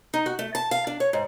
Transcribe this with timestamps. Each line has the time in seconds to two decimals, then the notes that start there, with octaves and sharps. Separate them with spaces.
0.14 D#4
0.26 F#4
0.39 A3
0.55 A5
0.71 F5
0.87 D4
1.00 C#5
1.13 G#2